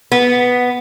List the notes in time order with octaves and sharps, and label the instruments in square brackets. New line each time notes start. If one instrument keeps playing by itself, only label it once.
[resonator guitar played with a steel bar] B3